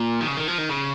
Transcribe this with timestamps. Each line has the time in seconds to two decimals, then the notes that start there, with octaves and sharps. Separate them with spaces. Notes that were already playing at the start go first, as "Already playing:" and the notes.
Already playing: A#2
0.21 D#3
0.27 C#3
0.37 D#3
0.48 F3
0.58 D#3
0.69 C#3